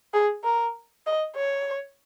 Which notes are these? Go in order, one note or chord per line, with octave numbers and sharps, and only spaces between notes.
G#4
A#4
D#5
C#5